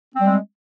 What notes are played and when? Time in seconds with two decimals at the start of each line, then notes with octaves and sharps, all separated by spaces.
0.15 C4
0.20 G3
0.24 G#3